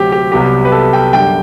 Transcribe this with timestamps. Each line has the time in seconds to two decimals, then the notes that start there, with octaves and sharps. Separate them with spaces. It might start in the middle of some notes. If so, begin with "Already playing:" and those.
Already playing: D2 C3 F#3 C4 G4
0.12 G4
0.32 C2 C3 F#3 B3 G4
0.65 B4
0.72 A4
0.93 G5
1.13 F#2 D3 G3 D4 G5